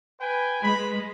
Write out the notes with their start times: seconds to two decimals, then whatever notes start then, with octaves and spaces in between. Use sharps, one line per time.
0.21 B4 G5 G#5
0.62 G#3 B4 B5